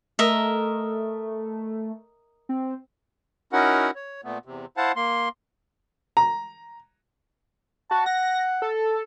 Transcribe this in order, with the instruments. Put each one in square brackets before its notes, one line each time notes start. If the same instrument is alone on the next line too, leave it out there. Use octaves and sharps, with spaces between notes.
[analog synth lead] A3 [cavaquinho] A#4 D#5 E5
[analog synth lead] C4
[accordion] C#4 D#4 E4 F#4 A#4 F#5
C#5
A#2 A3 B3
E2 C3
E4 C5 F5 F#5 A5
A#3 C6
[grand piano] A#5
[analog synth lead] F#4 [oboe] A5
[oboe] F#5 [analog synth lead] A#6
[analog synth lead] A4